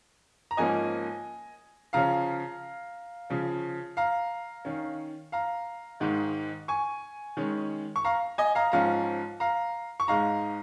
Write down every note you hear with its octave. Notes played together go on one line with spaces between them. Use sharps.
A#5
G#2 F3 A#3 C#4 D#5 G#5
C#3 F3 C#4 F5 A#5
C#3 F3 C#4
F5 A#5
D#3 C#4
F5 A#5
G#2 D#3 G#3 D#4
G#5 C#6
D#3 G#3 C#4
C#6
F5 A#5
D#5 G#5
F5 A#5
G#2 F3 C#4 F5 A#5
F5 A#5
C#6
G#2 G#3 D#4 F5 A#5